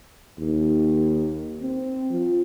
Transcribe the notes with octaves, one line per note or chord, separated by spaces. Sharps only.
D#2
C4
F3